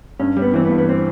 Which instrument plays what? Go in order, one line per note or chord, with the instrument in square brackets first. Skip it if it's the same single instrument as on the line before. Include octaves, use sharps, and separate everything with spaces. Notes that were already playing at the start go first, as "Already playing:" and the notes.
[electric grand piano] G2 [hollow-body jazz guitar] C#4
[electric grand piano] G3
[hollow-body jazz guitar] B3
[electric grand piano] E3 [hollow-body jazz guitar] C4
[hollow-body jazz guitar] B3
[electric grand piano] G2
[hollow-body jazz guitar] B3
C4